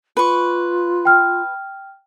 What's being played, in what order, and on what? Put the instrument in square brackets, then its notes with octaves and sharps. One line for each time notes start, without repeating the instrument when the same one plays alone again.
[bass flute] F4 [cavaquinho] B4 C#6
[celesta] G5 F6